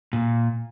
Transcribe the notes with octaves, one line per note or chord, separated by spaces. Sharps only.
A#2